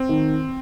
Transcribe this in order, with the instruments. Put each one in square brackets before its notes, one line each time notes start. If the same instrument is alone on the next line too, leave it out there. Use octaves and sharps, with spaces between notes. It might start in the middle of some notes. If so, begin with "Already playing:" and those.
Already playing: [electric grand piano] C4
[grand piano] D#3